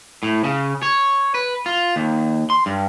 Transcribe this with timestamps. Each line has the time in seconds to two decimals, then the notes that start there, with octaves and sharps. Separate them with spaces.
0.23 A2
0.44 C#3
0.83 C#5
1.34 B4
1.66 F4
1.96 D#2
2.50 C6
2.66 G2